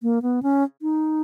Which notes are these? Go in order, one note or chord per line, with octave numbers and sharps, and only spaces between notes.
A#3
B3
C#4
D#4